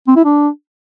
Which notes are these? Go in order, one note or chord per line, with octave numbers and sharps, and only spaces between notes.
C4
E4
D4